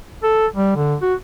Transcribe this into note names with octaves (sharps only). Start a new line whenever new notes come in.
A4
G3
D3
F#4